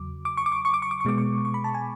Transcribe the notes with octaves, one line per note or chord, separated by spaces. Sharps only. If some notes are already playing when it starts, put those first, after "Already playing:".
Already playing: E2 C#3 F#3 D6
D6
C#6
D6
C#6
C#6
D6
C#6
D6
C#6
B2 G#3 B3 D6
C#6
C#6
B5
A5
G#5